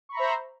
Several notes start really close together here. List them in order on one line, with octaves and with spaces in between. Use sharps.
C#6 B5 A#5 E5 C5